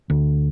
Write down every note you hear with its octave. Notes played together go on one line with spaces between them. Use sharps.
D2